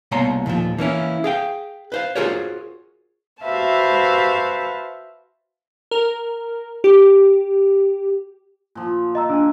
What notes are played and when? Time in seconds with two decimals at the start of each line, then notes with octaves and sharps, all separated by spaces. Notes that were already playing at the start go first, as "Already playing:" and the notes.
0.11 C2 B2 A#3 C#5 A#5 C6
0.46 D#2 A#2 E3 F3
0.78 E3 A#3 C#4 E4
1.24 G#4 F5 G5
1.92 B4 C5 F5
2.15 F4 F#4 G#4 A#4 C5 C#5
3.44 F#4 B4 C5 E5 F5 A5
5.91 A#4
6.84 G4
8.75 A#2 F3
9.15 D#5 A#5 E6
9.29 D4 G#5